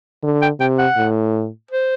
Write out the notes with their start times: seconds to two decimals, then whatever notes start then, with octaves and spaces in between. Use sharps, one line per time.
0.24 D3
0.42 G5
0.60 C3 G5
0.79 F#5
0.97 A2
1.71 C5